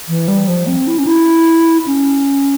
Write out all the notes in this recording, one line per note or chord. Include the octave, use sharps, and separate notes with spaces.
E3
G3
F3
C4
E4
C#4
E4
C#4